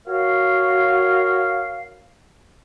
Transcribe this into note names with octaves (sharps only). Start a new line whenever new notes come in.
F#4 A#4 C#5 F5